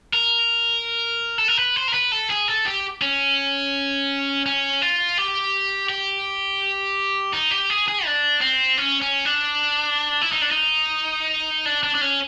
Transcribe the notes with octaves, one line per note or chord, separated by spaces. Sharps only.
A#4
A4
A#4
B4
C5
A#4
B4
A4
G#4
A4
G4
C#4
C#4
F4
G4
G4
D#4
G4
G#4
G#4
D4
C4
C#4
C#4
D4
E4
D#4
D4
D#4
D4
D4
D4
C#4